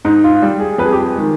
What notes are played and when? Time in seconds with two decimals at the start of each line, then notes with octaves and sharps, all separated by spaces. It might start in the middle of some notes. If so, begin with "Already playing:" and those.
0.05 G#2 D#4
0.24 F4
0.42 G3
0.60 G#4
0.78 F2 B4
0.86 G#4
0.92 G4
1.01 G#4
1.15 D#3 G#3